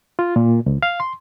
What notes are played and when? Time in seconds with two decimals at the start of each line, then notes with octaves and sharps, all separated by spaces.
0.19 F4
0.36 A#2
0.66 C#2
0.83 F5
1.00 C6